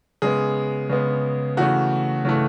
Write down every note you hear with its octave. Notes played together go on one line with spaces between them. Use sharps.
C#3 G#3 B3 G#4
C#3 G#3 B3
C#3 E3 A3 F#4
C#3 E3 A3